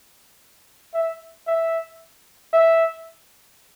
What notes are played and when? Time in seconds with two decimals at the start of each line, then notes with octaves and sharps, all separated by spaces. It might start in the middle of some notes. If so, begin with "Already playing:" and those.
0.94 E5
1.47 E5
2.53 E5